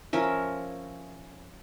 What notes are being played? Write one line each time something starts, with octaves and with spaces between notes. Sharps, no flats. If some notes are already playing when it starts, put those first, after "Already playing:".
F3 C#4 A#4 E5